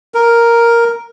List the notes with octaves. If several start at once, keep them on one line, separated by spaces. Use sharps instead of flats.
A#4